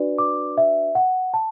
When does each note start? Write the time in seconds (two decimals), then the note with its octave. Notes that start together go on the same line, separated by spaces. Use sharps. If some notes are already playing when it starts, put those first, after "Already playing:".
Already playing: D4 F#4 B4 D5
0.18 D6
0.58 E5
0.95 F#5
1.34 A5